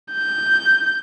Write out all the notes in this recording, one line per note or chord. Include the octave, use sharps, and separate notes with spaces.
G6